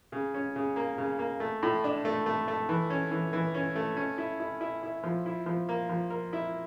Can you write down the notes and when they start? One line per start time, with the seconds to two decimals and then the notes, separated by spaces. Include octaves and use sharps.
0.12 C#3
0.34 C#4
0.56 C#3
0.76 A#3
0.98 C#3
1.19 A#3
1.40 A3
1.63 A2
1.84 D4
2.05 A3
2.26 A3
2.48 A3
2.69 E3
2.90 C#4
3.11 E3
3.33 E3
3.54 C#4
3.76 A3
3.97 C#4
4.18 E4
4.40 E4
4.61 E4
4.83 E4
5.04 F3
5.26 E4
5.46 F3
5.69 A#3
5.89 F3
6.10 A#4
6.33 E4